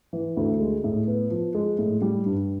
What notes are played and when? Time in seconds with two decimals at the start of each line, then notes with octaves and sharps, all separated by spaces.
0.13 E3
0.37 D2
0.60 G#3
0.84 A2
1.07 B3
1.30 F3
1.55 G#3
1.78 A2
2.02 G3
2.26 G2